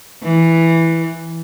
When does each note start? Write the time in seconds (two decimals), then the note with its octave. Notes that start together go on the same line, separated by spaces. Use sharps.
0.23 E3